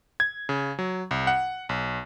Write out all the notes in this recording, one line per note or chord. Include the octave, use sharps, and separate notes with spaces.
G#6
C#3
F#3
C2
F#5
B1